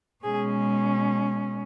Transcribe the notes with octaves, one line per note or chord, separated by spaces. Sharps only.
B2 G#3 C#4 G#4